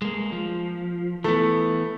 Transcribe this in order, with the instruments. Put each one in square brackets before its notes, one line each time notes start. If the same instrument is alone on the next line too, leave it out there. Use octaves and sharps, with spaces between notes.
[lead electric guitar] G#3 A#3
F3
[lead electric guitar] E3 B3 [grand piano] A3